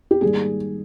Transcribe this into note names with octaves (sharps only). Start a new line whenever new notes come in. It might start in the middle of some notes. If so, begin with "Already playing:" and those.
G4
G#2 D#3 G3 A#3 G#4